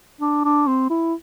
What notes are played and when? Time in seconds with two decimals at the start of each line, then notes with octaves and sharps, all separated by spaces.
0.21 D4
0.45 D4
0.67 C4
0.90 E4